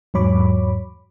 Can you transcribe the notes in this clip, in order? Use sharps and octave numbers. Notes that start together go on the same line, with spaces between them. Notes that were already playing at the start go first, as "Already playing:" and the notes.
E2 G#2 F#3 C#5 B5 D6